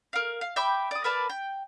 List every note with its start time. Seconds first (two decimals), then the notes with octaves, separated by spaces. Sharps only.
0.13 A#4 F5
0.41 F5
0.56 E5 G5 B5 D6
0.91 D5 D#6
1.04 A#4 B4 D5 A5
1.30 G5